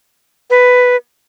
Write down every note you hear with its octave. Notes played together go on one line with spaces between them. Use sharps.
B4